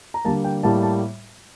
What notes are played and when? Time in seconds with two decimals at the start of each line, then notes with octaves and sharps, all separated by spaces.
0.14 A#5
0.25 D3 G3 A#3 A5
0.44 G5
0.63 A2 G3 A#3 A5
0.83 A5